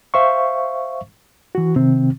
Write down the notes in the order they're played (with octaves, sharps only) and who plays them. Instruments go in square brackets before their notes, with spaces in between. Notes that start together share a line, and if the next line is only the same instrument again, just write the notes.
[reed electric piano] C5 E5 F5 C#6
E3 F#4
C3 D#3 C4